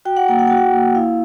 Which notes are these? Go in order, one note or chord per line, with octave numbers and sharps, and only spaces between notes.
F#4 G5
F#5
A#3 G5
F#5
F#4 G5
F#5
A#3
E4 F5